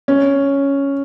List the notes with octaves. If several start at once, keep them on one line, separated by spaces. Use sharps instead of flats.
C#4